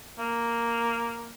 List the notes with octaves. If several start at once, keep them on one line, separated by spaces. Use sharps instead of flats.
A#3